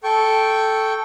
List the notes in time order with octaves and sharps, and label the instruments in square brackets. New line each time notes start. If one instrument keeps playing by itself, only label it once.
[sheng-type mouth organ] A4 G5 C#6